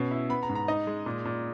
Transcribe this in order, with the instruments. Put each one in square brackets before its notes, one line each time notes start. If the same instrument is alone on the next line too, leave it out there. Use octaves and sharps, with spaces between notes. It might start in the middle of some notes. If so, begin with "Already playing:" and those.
Already playing: [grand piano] B2 C#4
E4
B3 B5
A#5
G#2
A#5
D#4 D#5
G#3
A#2
A#2